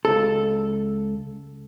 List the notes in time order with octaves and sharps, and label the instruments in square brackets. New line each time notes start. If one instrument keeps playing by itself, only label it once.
[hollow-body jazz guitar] C#2 A4